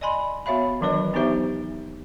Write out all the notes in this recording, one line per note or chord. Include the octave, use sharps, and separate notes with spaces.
D5 D#5 G#5 B5 C6
B3 F#4 C#5 E5 F5 B5
D#3 E3 F#3 D4 B4 D#5
F#3 B3 D#4 G4 C5 E5